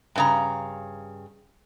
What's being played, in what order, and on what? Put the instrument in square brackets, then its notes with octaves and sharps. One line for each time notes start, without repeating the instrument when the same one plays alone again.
[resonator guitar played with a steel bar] G2 C#3 A#5